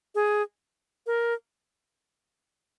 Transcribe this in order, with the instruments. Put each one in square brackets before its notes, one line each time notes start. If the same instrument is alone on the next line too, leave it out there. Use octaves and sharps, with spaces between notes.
[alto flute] G#4
A#4